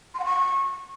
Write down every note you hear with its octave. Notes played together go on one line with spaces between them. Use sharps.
C6
F#5
C#6